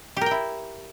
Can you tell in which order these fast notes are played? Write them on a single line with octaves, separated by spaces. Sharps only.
G4 A#4 G5 E4